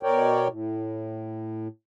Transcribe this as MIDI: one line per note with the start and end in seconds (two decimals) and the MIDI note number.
0.03 0.48 47
0.03 0.48 70
0.03 0.48 73
0.03 0.48 74
0.03 0.48 79
0.51 1.68 45